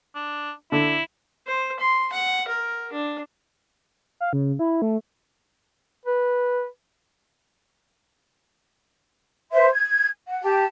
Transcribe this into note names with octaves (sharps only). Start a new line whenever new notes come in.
D4
D3 E4
C5
C6
F#5
A#4
D4
F5
C#3
E4
A3
B4
B4 C5 E5 C6
G#6
F#5
G4 A5